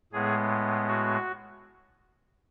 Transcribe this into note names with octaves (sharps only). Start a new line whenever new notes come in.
A2 G#3 B3 G#4
F#4